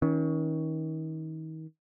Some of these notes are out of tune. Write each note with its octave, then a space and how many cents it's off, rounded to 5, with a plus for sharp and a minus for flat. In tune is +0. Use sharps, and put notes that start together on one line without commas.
D#3 +35 C#4 +10